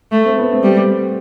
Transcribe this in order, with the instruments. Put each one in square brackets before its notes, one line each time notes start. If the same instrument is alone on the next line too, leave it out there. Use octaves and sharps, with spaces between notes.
[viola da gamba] A3
[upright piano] C4
B3
C4
[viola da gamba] G3